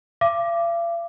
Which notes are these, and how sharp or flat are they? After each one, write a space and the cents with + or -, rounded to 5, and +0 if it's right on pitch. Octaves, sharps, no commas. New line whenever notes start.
F5 -45 D6 +5